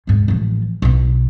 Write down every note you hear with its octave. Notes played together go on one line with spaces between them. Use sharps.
D2 G#2
A1 F3
B1 B2